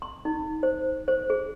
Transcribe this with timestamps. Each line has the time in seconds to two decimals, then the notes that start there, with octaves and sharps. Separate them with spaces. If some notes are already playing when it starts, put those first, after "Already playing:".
0.02 C6
0.25 D#4
0.63 C5
1.08 C5
1.30 G#4